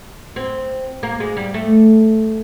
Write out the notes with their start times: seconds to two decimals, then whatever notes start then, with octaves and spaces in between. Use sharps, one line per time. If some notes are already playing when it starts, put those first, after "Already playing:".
0.36 C4
1.03 A#3
1.20 G#3
1.37 G3
1.54 A3